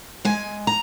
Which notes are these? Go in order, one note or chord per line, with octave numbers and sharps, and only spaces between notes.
G#3 G#5
A#5